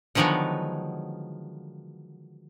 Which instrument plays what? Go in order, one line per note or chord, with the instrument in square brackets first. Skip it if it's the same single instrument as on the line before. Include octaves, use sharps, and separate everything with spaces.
[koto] D3 D#3 F3 F#3 G#3 B3